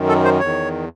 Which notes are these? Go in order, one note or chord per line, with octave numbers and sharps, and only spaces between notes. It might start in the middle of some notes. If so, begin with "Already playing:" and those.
Already playing: F#2 D#3
A4
C5
E2 D#3 C#5